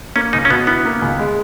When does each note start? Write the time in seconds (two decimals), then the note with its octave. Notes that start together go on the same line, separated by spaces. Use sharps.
0.16 A#3 C#4
0.33 C#2 D#4
0.45 C#4
0.50 B2 B3
0.67 B3 E4
0.85 A#3
1.02 C#2
1.19 G#3